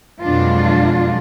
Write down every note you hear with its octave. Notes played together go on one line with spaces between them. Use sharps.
F2 B2 F#3 G#3 D4 F4